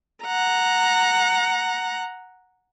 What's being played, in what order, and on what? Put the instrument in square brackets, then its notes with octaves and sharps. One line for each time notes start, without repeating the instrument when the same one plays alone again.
[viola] F#5 A#5